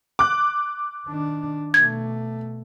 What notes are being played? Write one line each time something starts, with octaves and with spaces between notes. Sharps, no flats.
D6 F#6
D#3 D4
B2 A3 G#6